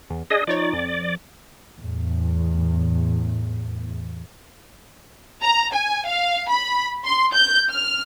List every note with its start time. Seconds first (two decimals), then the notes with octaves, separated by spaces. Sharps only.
0.10 E2
0.30 D4 G#4 D#5
0.47 F3 D#4 C#5 D5
0.73 F2
1.78 E2 A2
5.42 A#5
5.73 G#5
6.08 F5
6.49 B5
7.04 C6
7.34 G6
7.70 F6